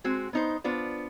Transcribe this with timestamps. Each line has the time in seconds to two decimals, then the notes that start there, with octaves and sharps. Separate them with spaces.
0.04 G#3 C4 F#4
0.33 B3 D#4 C5
0.64 B3 D4 F4 C5